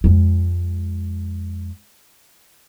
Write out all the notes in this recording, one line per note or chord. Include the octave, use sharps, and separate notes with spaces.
F2 G#3